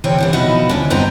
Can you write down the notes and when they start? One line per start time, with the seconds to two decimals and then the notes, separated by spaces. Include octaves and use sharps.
0.04 D2 C3 E3 C4 C#5 G5
0.18 C3 E3 B3
0.33 B2 F3 D#4 E4 F#4
0.69 D2 C#4 D4
0.90 G2 B3 C4 D#5 A#5